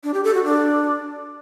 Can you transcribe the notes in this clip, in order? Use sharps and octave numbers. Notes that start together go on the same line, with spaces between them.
D4
G4
A4
F#4
D4